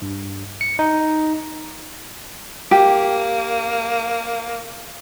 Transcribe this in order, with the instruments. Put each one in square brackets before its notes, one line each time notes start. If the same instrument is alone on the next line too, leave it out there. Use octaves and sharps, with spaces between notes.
[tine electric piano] G2
C#7
D#4
[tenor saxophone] A#3 [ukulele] G4